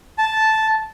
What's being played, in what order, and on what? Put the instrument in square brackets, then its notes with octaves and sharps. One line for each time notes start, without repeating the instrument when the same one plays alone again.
[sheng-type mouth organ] A5